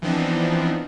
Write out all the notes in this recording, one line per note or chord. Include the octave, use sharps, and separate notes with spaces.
E3 F3 B3 C4 D4 D#4